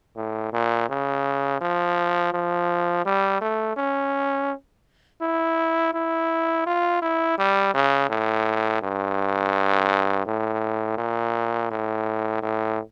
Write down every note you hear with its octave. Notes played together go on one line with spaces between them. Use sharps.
A2
A#2
C#3
F3
F3
G3
A3
C#4
E4
E4
F4
E4
G3
C#3
A2
G2
A2
A#2
A2
A2